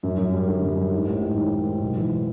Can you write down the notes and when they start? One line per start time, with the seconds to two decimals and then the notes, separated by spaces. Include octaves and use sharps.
0.03 F#2
0.18 F#2
0.34 G3
0.48 D3
0.62 F#2
0.77 G3
0.92 G#2
1.08 A1
1.22 G#2
1.37 D#3
1.51 A1
1.66 G#2
1.81 B1
1.97 E3